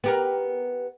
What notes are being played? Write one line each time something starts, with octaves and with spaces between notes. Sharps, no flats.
B3 G4 A#4